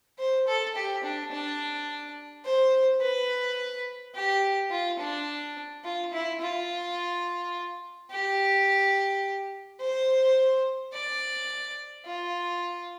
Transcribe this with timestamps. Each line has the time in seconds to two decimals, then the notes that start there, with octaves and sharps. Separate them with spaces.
0.19 C5
0.47 A4
0.75 G4
1.04 D4
1.31 D4
2.45 C5
3.01 B4
4.15 G4
4.71 F4
4.99 D4
5.84 F4
6.13 E4
6.41 F4
8.11 G4
9.80 C5
10.93 D5
12.06 F4